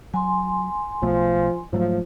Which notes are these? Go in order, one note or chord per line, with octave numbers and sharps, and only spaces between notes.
F#3 G#5 C6
B1 B2 F3 A3
G#2 F3 F#3 A3